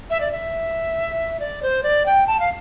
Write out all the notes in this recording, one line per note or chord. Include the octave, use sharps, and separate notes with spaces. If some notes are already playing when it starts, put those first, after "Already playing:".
E5
D5
E5
D5
C5
D5
G5
A5
F5